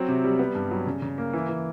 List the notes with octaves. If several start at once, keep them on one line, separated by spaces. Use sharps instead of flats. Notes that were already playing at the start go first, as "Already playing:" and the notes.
Already playing: F#3 C4
C3
G3
B3
G2
F#3
C#3
C#3
A#3
E3
E3